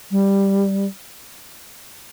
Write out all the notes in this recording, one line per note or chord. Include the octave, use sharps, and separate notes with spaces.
G3